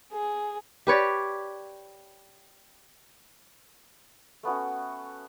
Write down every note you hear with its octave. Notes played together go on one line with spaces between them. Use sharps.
G#4
G4 B4 C#5 D5
A3 B3 C#4 F#4